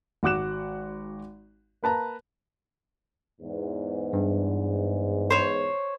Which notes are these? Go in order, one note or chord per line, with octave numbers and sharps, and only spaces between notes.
G#1 F#4 F#5 D6 F#6 E7
A#3 B4 A5 A#5
E2 G#2
G2
C5 C#5